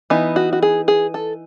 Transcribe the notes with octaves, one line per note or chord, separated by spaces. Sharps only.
E3 B3 D#4
F#4
F#4
G#4
G#4
A4